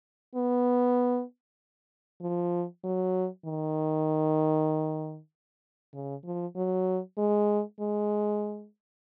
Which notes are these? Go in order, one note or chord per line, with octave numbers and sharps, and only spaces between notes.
B3
F3
F#3
D#3
C#3
F3
F#3
G#3
G#3